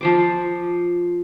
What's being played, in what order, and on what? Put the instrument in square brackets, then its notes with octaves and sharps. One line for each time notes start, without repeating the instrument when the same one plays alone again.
[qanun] F3 C5 D6